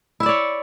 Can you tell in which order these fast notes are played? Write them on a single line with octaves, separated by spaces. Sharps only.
E4 E5 D5 C#5